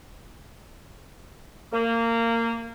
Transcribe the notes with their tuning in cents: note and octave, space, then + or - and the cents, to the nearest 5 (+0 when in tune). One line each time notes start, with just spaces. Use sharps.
A#3 -20